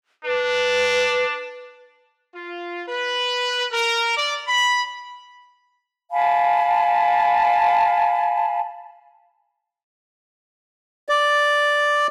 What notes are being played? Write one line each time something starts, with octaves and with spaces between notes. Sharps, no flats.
D4 B4
F4
B4
A#4
D5
B5
F5 G#5 A5 B5
D5